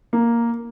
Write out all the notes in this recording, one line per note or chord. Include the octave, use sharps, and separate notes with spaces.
A#3